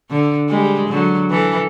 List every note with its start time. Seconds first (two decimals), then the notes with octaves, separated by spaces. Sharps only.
0.11 D3
0.49 G3 G#3
0.88 D3 F#3
1.30 E3 A4